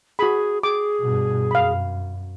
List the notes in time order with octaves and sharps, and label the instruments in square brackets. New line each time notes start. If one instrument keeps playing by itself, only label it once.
[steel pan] F#4 B5 [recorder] G#4
[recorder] G#4 [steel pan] D6
[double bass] G2 B2
[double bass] F#2 [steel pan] F5 B5